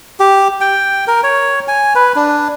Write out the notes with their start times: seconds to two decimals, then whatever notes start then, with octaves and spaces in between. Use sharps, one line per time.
0.20 G4
0.61 G5
1.08 A#4
1.23 C#5
1.68 G#5
1.95 B4
2.16 D4